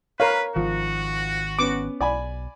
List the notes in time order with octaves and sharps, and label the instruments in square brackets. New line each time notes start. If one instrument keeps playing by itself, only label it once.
[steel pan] A#4 F5 [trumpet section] B4 [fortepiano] C#5
[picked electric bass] G#1 D#3 [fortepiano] F3 [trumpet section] F#4
[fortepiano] B3 C#4 [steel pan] D6
[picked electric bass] B1 [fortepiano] D5 G#5 B5